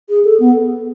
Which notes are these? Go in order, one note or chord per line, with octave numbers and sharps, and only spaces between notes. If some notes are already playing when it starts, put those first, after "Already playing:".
G#4
A4
B3